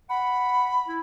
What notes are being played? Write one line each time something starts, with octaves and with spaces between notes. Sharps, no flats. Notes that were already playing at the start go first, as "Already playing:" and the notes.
F#5 B5
E4